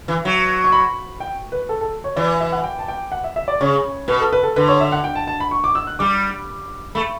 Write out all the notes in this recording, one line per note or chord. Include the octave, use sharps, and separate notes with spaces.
E3
F#3
C#6
B5
G5
B4
A4
A4
C#5
E3 D5
E5
F#5
G5
A5
G5
F#5
E5
E5
D5
C#3 C#5
B2 B4
A4
B4
A4
D3 B4
C#5
E5
F#5
G5
A5
A5
B5
C#6
D6
E6
F#6
G3 D6
A3 B5